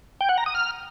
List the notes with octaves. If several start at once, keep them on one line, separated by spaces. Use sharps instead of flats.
G5
F#5
A#5
D#6
F6